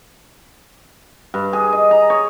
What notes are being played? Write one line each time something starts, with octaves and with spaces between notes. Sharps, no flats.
G2
G#4
D#5
A#5
C#5